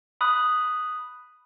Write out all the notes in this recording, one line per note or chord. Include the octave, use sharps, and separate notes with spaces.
B5 D#6 F#6